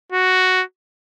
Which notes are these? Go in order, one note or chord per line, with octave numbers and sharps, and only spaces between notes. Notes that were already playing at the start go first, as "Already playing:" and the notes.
F#4